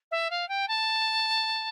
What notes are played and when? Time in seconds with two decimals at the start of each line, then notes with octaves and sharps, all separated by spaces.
0.11 E5
0.30 F5
0.49 G5
0.68 A5